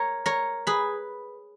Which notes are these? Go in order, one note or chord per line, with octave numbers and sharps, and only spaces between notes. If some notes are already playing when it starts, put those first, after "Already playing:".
Already playing: A#4 C#5
A#4 C#5
G#4 B4